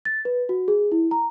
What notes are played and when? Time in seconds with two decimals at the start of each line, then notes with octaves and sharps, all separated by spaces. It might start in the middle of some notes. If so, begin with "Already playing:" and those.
0.05 A6
0.25 B4
0.49 F#4
0.68 G#4
0.92 E4
1.11 A#5